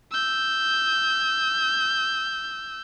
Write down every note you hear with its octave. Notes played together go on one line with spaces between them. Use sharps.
E6 G6